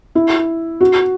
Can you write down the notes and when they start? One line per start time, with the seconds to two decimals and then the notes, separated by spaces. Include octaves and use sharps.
0.15 E4
0.81 F#4